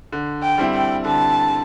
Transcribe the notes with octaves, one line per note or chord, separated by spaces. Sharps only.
D3
G5
G3 C4 E4
G5
D3 A5